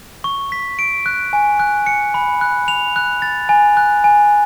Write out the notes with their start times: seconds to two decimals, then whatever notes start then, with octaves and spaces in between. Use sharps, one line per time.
0.24 C#6
0.52 B6
0.79 D7
1.06 F#6
1.33 G#5
1.59 F#6
1.86 C#7
2.14 B5
2.41 F#6
2.68 F7
2.96 F#6
3.22 A6
3.49 G#5
3.77 F#6
4.04 G#5